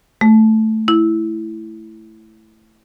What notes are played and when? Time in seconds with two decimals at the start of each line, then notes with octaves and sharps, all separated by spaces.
0.21 A3
0.88 E4